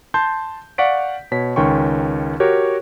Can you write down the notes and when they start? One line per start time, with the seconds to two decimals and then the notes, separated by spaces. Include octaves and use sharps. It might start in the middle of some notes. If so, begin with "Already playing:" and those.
0.14 A5 C6 G6
0.78 D5 F5 F#5 C#6 B6 D7
1.32 B2 C#5 B6
1.56 C#2 D#3 C#4 G5 C6 C#6
2.40 F#4 G4 A#4 C#5